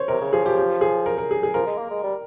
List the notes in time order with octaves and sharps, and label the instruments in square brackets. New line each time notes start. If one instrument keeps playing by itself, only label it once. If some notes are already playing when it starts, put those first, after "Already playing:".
Already playing: [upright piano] C5 C#5
[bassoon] C3 [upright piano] A#4
[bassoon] C#3
[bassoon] F3 [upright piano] G#4
[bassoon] F3 [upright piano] G4
[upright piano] G4
G#4
A#4
A#4
G#4
G#4
[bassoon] F3 [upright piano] A#4
[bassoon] G#3
A#3
G#3
G3